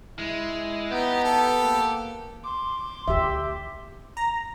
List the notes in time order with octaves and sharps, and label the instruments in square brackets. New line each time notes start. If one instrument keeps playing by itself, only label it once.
[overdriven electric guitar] G#3 [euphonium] E4
[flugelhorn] B3 [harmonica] D#4 [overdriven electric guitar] G4
[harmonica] A4
[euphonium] A#3
[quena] C6 [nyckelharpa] D6
[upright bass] D2 [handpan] G4 E5
[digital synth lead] A#5